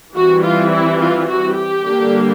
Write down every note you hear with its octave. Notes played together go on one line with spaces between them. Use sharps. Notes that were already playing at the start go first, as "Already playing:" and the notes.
E3 G3 C4 F#4
F4
E4
F4
F#4
G4
D3 G3 A#3 D4